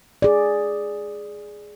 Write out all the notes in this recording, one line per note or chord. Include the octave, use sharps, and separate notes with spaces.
G#4 D5